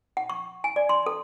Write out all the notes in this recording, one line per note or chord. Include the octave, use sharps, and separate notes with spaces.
F#5
C#6
G#5
D5
C6
A4